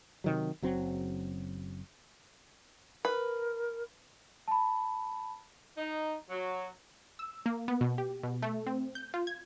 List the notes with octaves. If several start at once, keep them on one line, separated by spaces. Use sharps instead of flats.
C3 D#3 F#3
F#1 F#3 C4
A#4 B4
A5 B5
D#4
F#3
E6
A#3
B3
B2
G4
B2
A3
C4
G6
F4
G#6